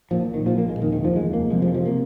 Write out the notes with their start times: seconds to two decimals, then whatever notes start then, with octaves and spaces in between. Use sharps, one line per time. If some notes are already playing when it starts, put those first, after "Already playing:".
0.11 A#1 A#2 F3
0.34 D#3
0.46 A#1 A#2 F3
0.58 A#3
0.69 G#3
0.81 F1 D#3
0.84 D#2
0.93 D#3
1.05 F3
1.15 F1 D#2 G#3
1.34 A#3
1.51 F1 F2 C3 G#3
1.62 F3
1.74 F3
1.86 C3 A#3